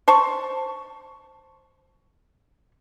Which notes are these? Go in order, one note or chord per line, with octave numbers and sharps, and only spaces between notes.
C5 A5 C#6